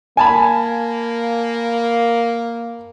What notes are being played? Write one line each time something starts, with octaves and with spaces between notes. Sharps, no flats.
A#3 G#5 A5 B5